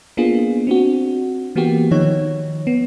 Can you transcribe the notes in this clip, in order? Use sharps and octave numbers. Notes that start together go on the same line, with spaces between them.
A#3 B3 D4 F4 G#4
C4 D4 F#4
E3 A#3 B3 F#4 G4
D#3 F3 D#4 C#5
B3